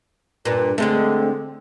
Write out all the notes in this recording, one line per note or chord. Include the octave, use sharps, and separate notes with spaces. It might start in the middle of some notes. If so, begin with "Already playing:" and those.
G2 A#2 B4
D3 G#3 A3 C4